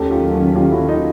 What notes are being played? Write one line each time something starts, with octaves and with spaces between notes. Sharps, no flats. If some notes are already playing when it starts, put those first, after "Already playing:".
Already playing: D#2 D#3 F#3 A3 C#4 G4 A4
F4 G4
F4 G4
E4 F#4
D#4 F4